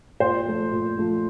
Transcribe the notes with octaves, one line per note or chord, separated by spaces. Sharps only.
A#2 C5
F3 A3
A#2
F3 A3